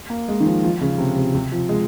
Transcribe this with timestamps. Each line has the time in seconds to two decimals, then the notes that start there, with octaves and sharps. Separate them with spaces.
0.10 A#3
0.28 G#3
0.40 D#3
0.46 F3
0.64 F3
0.81 C#3
0.98 C3
1.17 C3
1.35 C3
1.52 F3
1.69 G#3